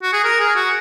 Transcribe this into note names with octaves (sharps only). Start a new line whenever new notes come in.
F#4
G#4
A#4
G#4
F#4